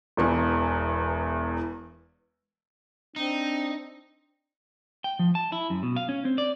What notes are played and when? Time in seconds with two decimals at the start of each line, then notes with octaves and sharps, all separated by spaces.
0.17 E1 E2 E3
3.16 C4 D4 D#4
5.04 G5
5.19 F3
5.35 A5
5.52 E4
5.70 F#2
5.83 B2
5.96 F5
6.09 C#4
6.25 C4
6.38 D5